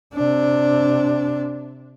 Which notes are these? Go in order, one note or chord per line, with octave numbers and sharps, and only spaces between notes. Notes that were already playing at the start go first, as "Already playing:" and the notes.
C3 D4